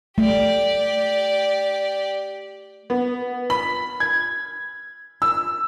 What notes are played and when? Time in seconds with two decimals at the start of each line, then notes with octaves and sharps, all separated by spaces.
0.18 A3 G4 D5
2.90 B3
3.50 B5
4.00 G#6
5.22 E6